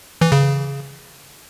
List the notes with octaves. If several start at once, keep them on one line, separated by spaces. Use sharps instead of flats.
E3
C#3